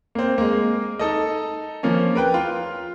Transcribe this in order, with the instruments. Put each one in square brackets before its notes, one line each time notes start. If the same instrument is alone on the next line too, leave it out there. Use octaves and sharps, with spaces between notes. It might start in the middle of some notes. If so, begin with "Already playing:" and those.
[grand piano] A#3 C4
G#3 A#3
D#4 A4 D#5
F3 A#3 C#4
A#4 B4 G5
F4